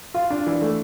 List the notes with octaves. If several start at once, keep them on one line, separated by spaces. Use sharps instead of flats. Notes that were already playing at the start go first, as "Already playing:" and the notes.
F4
D4
E3
A3